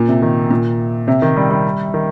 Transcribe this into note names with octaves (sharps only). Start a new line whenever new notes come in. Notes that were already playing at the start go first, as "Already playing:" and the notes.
Already playing: A#2
C3
D#3
A#2
C3
D#3
G3
G3
D#3